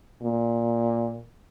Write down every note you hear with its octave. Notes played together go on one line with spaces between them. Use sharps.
A#2